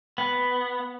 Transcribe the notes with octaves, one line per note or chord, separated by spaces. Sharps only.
B3